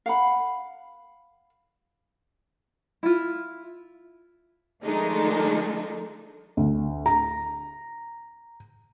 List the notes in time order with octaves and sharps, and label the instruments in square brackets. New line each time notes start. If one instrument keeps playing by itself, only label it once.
[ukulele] F5 F#5 B5
E4 F4
[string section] D#3 F3 G#3 A3 D4 D#4
[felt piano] D2
A#5